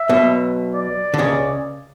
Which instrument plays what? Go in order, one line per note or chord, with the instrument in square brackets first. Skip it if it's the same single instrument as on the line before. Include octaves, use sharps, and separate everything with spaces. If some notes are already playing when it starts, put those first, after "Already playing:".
Already playing: [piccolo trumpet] E5
[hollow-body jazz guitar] B1 B2
[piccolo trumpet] D5
[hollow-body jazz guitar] D3
C#2 C#3